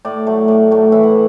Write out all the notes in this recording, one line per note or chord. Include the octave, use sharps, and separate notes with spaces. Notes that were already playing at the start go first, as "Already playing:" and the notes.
A2 D5
F#3 A3
A2
F#3 A3
E3 E5
F#5